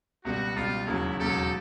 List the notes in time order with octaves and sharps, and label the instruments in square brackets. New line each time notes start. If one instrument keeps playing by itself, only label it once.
[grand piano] C#2 B2 G3 [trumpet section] F#4
[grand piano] C#2 B2 G3 [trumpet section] F4
[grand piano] E1 D#2 C#3 F#3 [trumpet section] E4
[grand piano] E1 D#2 C#3 F#3 [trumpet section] G4 A4